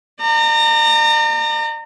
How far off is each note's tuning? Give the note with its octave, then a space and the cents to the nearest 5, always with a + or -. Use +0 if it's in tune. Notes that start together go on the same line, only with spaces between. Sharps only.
D5 +35 A#5 -30